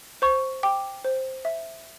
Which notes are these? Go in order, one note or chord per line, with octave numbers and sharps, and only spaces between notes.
C5 C#6
G5 D6
C5
E5